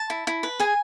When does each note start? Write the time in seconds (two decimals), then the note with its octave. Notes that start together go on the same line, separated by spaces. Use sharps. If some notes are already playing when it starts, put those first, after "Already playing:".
Already playing: A5
0.10 E4
0.27 E4
0.43 B4
0.60 G#4 G#5